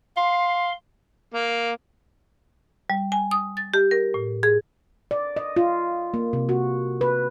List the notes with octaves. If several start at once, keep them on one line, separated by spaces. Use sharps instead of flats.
F5 C6
A#3
G3
G#5
D#6
A6
G4
A#4
A2
G#4
D5
D#5
F4
A#3
C3
F#4
B4